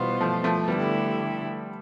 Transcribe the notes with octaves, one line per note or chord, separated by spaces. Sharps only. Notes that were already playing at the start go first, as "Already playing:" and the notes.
Already playing: B2 E3 G3 B3 F4 C5
F3 A3
F3 A3
D3 G3 A3 B3 E4 G4